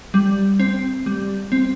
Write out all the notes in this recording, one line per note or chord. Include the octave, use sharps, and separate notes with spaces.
G3
C4
G3
C4